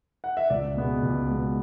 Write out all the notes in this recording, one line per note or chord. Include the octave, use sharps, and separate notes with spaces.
F#5
E5
C#2 D5
B2 G#3 B3
C#2
B2 G#3 B3